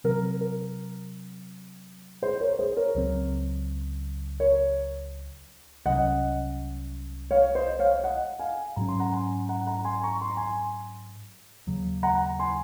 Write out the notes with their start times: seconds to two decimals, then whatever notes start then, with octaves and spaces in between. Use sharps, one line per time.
0.04 C3 F#3 C4 A#4
0.41 A#4
2.22 G#4 C5
2.40 A#4 C#5
2.59 G#4 C5
2.77 A#4 C#5
2.95 C#2 C#3 F#3 C4
4.40 A#4 C#5
5.85 C2 C3 F#3 C#4 D#5 F#5
7.31 C#5 F5
7.55 C5 D#5
7.79 C#5 F5
8.03 D#5 F#5
8.39 F5 G#5
8.76 G#2 F#3 C#4 A#5
8.88 C6
9.00 F#5 A#5
9.13 G#5 C6
9.49 F#5 A#5
9.67 F#5 A#5
9.85 G#5 C6
10.03 A#5 C#6
10.21 C6
10.30 A#5
10.37 G#5 C6
11.67 D#2 C#3 F#3
12.03 F#5 A#5
12.39 G#5 C6